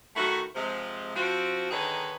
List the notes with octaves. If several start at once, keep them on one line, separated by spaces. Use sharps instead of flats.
D#3 A3 E4 F#4
C3 F3 G#3
F3 C4 F#4
D3 D#3 D#4 G#4 B4 C#5